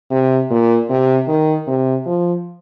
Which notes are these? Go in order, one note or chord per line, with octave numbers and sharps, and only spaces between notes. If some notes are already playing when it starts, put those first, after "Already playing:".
C3
A#2
C3
D#3
C3
F3